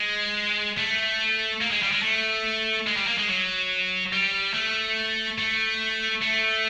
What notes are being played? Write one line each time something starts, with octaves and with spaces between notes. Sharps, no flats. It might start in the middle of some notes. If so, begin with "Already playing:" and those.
Already playing: G#3
A3
A#3
G#3
G3
G#3
A3
G#3
G3
A#3
G#3
F#3
G3
A3
A3
A3